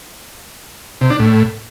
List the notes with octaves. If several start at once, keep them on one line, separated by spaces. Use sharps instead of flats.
C3
D4
A2